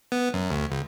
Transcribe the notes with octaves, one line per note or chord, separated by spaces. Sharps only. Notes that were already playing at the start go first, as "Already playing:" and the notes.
B3
F#2
D2
C#2